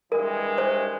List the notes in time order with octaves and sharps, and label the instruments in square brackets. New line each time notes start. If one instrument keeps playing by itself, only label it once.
[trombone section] G2 E3 G#3 [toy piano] A#4
[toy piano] C5